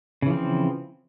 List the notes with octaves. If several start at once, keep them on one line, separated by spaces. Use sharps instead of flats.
C#3 E3 F3 C4